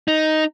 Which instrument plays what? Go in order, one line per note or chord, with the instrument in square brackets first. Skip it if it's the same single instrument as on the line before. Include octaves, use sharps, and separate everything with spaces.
[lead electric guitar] D#4